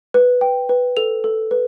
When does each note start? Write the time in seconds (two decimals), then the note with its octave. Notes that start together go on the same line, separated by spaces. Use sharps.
0.14 B4
0.41 G5
0.69 B4
0.97 A4 F7
1.24 A4
1.51 B4